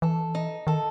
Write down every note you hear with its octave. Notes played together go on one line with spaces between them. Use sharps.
E3 A4
D#4
D#3 A4